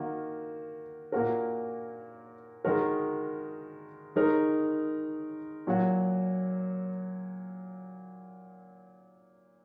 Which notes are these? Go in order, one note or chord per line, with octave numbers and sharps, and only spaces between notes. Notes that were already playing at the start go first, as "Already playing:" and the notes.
Already playing: D#3 A#3 F#4 A#4
A#2 A#3 F#4 A#4
D#3 G#3 F#4 A#4
D#3 G#3 D#4 A#4
A#2 F#3 A#3 F#4